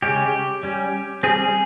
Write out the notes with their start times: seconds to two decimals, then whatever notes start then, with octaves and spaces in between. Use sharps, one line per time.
0.02 C#3 G#3 C#4 G4
0.63 G3 C#4
1.23 G3 C4 G#4